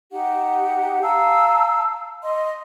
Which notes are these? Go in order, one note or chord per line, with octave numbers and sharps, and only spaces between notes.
D#4 G4 F#5
F5 A5 A#5 E6
D#5 C6